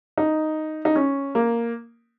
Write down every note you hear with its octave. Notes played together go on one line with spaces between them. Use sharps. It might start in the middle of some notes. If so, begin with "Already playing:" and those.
D#4
D#4
C#4
A#3